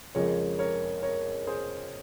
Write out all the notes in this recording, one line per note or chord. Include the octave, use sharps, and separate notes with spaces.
F2 C#3 F3 G#3 A#4 C#5
A#4 C#5
A#4 C#5
G#4 C5